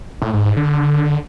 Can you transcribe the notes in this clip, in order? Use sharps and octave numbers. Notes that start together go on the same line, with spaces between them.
A2
G#2
G#2
D3